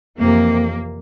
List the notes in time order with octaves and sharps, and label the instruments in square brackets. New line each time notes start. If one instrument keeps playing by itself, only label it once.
[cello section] F2 C3 E3 A#3